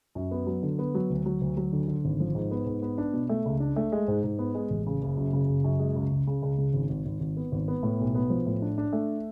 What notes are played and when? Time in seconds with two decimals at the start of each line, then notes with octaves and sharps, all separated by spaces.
0.15 F#2
0.31 B3
0.47 F#3
0.63 D3
0.79 B3
0.95 F#3
1.10 D2
1.26 F#3
1.41 D2
1.57 F#3
1.73 D3
1.88 D3
2.05 G#1
2.20 F3
2.35 G#2
2.51 B3
2.66 G#2
2.82 B3
2.98 D4
3.13 B2
3.29 A3
3.46 C#2
3.60 D4
3.76 A3
3.92 G#3
4.08 G#2
4.24 G#2
4.39 B3
4.54 G#3
4.70 A1
4.86 C#3
5.02 F#1
5.17 F#2
5.33 C#3
5.49 F#1
5.64 F#2
5.79 G#3
5.96 C#2
6.11 C#3
6.27 C#3
6.43 C#2
6.58 C#3
6.73 G#1
6.89 G#1
7.06 G#1
7.20 G#1
7.37 B3
7.52 G#1
7.68 B3
7.83 A2
8.00 B1
8.15 B3
8.30 F3
8.47 A2
8.62 D4
8.78 D4
8.93 A3